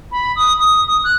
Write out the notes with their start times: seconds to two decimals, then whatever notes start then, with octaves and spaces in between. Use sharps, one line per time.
0.11 B5
0.36 D#6
0.59 D#6
0.88 D#6
1.04 F#6